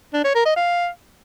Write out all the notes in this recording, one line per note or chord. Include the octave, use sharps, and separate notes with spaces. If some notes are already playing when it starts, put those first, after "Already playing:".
D4
C#5
A#4
D#5
F5